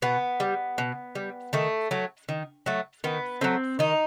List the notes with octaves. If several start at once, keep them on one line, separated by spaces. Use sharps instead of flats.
B2 B3
G3
B2
G3
D#3 A3
F#3 A3
D#3
F#3 A3
D#3 B3
F#3 A3 C4
D#3 D#4